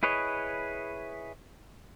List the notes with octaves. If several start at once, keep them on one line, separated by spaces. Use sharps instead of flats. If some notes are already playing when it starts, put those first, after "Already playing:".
E4 G#4 B4 C#5 D#5